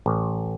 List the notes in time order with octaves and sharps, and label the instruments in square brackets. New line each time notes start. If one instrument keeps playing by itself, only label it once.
[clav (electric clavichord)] A1